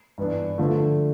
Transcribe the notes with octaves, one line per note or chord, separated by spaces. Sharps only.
G2 E3 B3 D4
D3 F3 A3